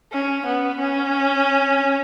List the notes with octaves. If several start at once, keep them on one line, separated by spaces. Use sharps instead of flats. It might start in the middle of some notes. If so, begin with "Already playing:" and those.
C#4
B3
C#4